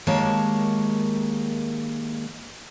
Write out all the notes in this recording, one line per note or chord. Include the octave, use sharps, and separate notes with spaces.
D#3 G#3 A#3 G4 C#5 A5